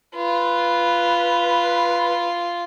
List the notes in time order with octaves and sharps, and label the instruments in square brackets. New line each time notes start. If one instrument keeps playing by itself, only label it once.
[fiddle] F4 [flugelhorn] B4